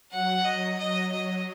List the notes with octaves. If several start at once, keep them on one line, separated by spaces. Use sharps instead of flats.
F#3 F#5
D#5
F#3 D#5
F#3 D#5